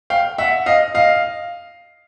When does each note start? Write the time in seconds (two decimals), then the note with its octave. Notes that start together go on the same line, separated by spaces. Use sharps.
0.10 F5 G5
0.38 E5 F#5
0.66 D#5 F5
0.94 D#5 F5